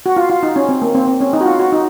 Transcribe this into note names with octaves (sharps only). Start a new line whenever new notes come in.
F#4
F4
F4
D#4
C#4
C4
A#3
C4
C4
C#4
D#4
F#4
F4
F#4
D#4